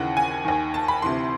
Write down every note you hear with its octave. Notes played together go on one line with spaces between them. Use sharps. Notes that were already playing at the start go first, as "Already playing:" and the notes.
Already playing: D#2 C#3 E3 F#5
G#5
D#2 D#3
A5
B5
D2 C3 E3 C6